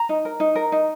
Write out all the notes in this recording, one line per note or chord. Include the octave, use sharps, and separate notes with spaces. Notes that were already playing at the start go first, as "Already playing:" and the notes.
Already playing: A#5
D#4
A#4
D#4
A#4
D#4